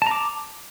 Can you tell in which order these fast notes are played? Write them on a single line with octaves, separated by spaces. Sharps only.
A5 A#5 D6